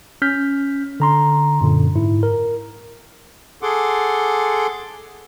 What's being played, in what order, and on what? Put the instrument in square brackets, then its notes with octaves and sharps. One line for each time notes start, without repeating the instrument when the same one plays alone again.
[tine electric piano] C#4 F6 G6 B6
D3 A#5 C6
F#2 A#2 D3
G#2 E4
A#4
[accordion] G#4 A4 F#5 C6 D6